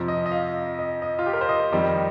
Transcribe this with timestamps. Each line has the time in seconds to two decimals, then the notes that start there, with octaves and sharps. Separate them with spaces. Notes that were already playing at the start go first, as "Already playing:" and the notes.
Already playing: F2 C3 F3
0.08 D#5
0.26 D#5
0.31 F5
0.79 D#5
1.02 D#5
1.19 F4
1.26 G4
1.33 A#4
1.41 C5
1.49 D#5
1.72 F2 D#3 G3